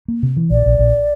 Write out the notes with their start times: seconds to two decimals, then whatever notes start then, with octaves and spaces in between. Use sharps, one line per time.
0.08 A#3
0.23 C3
0.37 E3
0.50 A#1 D5
0.66 A#1
0.79 A#1